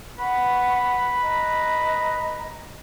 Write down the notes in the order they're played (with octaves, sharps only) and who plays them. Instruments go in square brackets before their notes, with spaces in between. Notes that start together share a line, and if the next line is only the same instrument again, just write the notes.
[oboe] B4 [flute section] F#5 B5 C#6
[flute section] D#5 A#5